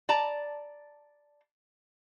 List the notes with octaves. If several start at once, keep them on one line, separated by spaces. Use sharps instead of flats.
D5 A5 A#5